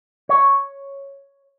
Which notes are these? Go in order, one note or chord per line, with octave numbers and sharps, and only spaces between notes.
C#5